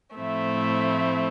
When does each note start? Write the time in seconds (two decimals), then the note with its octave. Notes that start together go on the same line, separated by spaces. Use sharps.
0.16 A2 F3 A3 C4 E4